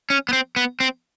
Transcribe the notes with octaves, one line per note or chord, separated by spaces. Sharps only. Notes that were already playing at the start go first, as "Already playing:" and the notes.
C#4
B3
C4
B3
C4